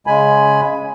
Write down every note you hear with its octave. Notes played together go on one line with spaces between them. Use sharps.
C#3 G#3 G#5 B5